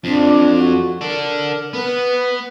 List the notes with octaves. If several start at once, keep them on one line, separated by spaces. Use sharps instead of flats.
F2 D4
F#4
A4 A#4 D5
B3 B4